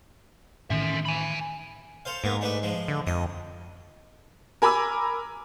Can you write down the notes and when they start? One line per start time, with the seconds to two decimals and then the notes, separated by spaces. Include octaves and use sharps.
0.70 A2 D#3 E3 C#4 E5
1.05 G#5 B5
2.05 A4 C5 F5
2.24 G#2 A#3 B3
2.41 A3 D4 B4
2.63 F3 G#3
2.88 D3
3.07 F2 D#5
4.62 A#4 G#5 B5 D6 E6